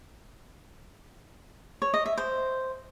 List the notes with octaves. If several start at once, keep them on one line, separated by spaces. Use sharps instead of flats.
C#5
D#5
E5
C5